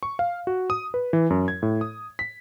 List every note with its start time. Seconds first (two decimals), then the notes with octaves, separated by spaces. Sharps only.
0.03 C#6
0.19 F5
0.47 F#4
0.70 D#6
0.94 B4
1.13 E3
1.30 F#2
1.48 G#6
1.62 A2
1.81 D#6
2.19 B6